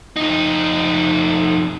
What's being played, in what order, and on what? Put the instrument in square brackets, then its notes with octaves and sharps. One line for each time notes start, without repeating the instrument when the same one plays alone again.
[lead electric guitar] F2 D#4